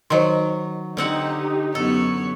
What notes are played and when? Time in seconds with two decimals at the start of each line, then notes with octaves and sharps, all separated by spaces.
0.10 D#3 F#3 C5 D#5 C6
0.97 D3 C4 D#4 G4 F#5
1.75 F#2 B3 A4 C#5